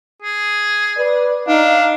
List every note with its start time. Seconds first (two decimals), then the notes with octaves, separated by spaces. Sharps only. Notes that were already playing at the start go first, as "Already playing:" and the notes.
0.22 G#4
0.97 B4 D5
1.48 D4 D#4 F5